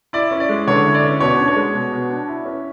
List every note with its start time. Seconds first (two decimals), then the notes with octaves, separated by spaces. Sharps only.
0.13 E4 D5
0.31 C#4
0.40 D5
0.49 G#3
0.67 D3 C#5
0.84 E4
0.94 D5
1.03 C#4
1.20 B2 C#5
1.38 D4
1.48 C#5
1.56 G#3
1.74 B2
1.92 B2
2.09 D4
2.28 E4
2.45 C#4